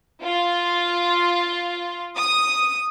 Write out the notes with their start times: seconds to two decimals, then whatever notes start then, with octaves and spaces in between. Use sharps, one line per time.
0.24 F4
2.18 D#6